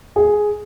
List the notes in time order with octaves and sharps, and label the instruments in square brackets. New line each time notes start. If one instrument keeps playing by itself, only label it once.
[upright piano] G#4